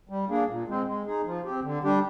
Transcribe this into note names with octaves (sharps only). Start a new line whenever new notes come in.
G3
A#3 D4 G#4
A#2
G#3 C4
G#3
D#4 G#4
F3
C4 G4
D3
G3 D4 G4